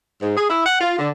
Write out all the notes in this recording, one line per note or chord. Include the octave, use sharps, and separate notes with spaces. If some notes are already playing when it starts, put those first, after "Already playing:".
G#2
G#4
E4
F#5
F4
D3